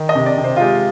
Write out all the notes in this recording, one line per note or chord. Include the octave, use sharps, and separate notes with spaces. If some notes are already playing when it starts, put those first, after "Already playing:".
Already playing: D#3
D#5
C3
D5
C3
C5
F4
G#3 G4